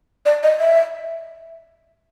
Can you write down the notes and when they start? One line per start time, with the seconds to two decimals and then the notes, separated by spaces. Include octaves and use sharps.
0.25 D5
0.43 D#5
0.60 E5